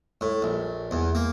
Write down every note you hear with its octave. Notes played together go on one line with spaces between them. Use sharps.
A2
A#1
E2
A#3